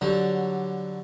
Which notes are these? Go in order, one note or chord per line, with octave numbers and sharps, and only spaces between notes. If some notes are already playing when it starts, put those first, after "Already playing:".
D3 F#3 G3